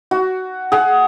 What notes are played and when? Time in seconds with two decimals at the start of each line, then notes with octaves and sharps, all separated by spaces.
0.11 F#4
0.72 G#4 F#5